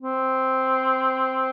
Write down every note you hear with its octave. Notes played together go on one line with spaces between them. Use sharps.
C4